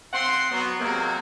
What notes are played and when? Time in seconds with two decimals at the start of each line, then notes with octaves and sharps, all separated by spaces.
0.13 C4 C5 F5 F#5 C6
0.51 F#3 B3
0.80 C3 F#3 G#3 A#3 F#4 A#4